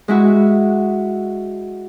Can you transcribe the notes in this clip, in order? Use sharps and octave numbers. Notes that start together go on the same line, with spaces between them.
G#3 E4 F#4